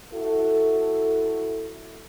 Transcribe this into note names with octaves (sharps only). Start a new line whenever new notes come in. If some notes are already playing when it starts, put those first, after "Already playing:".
E4 F#4 A4